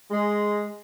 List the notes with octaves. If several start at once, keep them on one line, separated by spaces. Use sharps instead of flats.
G#3